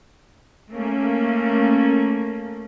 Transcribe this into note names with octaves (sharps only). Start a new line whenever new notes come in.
A3 A#3 C#4